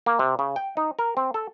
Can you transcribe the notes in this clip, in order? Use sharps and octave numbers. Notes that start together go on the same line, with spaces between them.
A#3
C3
C#3
G5
D#4
A#4
C4
A4